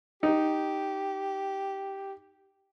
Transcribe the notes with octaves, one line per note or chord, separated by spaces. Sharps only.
D#4 G4